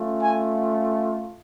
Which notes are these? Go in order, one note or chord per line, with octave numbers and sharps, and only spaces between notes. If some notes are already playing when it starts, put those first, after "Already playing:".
Already playing: A3 C#4 F4
G#5